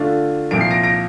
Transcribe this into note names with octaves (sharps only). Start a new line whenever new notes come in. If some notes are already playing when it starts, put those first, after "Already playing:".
Already playing: D3 A3 D4 F4
C2 A#2 F3 D7
C7
A#6 D7
A#6 D7